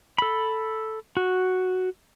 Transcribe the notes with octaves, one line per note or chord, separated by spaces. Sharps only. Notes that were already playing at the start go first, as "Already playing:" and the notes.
A4 B5
F#4